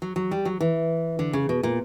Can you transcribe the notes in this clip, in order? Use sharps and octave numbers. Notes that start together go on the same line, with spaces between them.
F#3
F#3
G3
F#3
E3
D3
C#3
B2
A#2